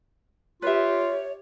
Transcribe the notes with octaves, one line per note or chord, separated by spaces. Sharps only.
F4 G4 B4 C#5 E5